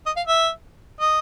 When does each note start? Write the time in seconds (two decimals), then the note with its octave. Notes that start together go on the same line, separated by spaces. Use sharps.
0.06 D#5
0.16 F5
0.27 E5
1.01 D#5